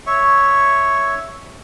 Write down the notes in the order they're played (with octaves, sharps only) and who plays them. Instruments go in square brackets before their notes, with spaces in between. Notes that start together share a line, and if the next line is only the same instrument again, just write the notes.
[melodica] C#5 E5 C#6